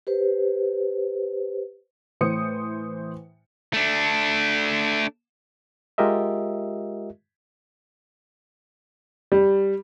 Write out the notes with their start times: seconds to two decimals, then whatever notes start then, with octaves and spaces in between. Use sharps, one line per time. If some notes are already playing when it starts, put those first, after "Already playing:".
0.07 G4 B4 C5
2.21 A2 E3 C5 D#6 C#7
3.73 A3 D4
5.98 G#3 F4 G4 A#4 D#5 E5
9.32 G3